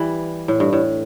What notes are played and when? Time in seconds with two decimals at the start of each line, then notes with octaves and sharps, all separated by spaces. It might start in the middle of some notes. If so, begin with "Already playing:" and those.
Already playing: E3 G3
0.48 A2
0.60 G2
0.73 A2